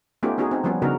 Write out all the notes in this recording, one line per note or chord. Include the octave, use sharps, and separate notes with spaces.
A3 B3 C#4 D#4 F4 G4
B3 C#4 D#4 F#4 G#4
C4 D#4
F3 G3 B3 C#4
C#3 B3 D4 D#4 F#4 A#4